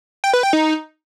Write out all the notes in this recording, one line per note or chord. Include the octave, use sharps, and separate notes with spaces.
G5
B4
G5
D#4